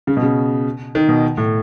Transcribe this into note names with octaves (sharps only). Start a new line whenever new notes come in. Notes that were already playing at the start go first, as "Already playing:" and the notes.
C#3
B2
C#3
D#3
B2
A2